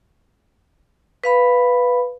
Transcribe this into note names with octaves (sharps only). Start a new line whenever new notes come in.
B4 F5 B5